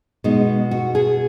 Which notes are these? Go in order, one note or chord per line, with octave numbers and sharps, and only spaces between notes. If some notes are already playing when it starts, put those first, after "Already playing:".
B2 G#3 D#4
F#4
G#4